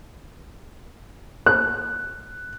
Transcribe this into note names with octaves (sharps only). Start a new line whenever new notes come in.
F#6